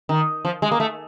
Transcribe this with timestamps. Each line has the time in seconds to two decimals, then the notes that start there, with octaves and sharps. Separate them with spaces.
0.09 D#3
0.45 F3
0.62 G#3
0.72 A#3
0.80 A3